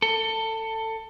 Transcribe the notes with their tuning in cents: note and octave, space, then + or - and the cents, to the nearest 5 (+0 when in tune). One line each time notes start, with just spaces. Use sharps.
A4 +20